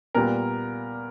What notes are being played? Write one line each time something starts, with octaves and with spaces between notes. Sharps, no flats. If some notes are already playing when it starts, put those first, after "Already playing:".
A#2 G3 B3 A#4